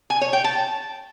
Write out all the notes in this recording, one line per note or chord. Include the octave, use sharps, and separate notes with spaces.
G#5
C#5
G5
A5